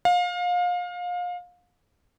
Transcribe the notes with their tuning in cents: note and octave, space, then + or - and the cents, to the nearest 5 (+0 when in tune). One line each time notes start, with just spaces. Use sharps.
F5 +30